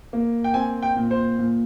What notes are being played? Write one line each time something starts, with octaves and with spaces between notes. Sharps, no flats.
A#3
G5
C4 G#5
G5
A#2
C5
A#2